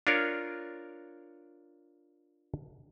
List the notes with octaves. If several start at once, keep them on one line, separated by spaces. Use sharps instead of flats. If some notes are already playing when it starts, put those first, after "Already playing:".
D4 F4 A#4 C#5 D5